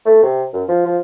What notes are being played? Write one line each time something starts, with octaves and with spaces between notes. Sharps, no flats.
A3
C3
F#2
F3
F3